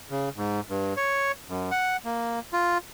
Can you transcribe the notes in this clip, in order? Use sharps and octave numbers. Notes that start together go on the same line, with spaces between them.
C#3
G#2
G2
C#5
F#2
F#5
A#3
F4